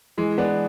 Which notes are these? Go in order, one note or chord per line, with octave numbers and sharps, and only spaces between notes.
E3 G#3
E3 B3 D4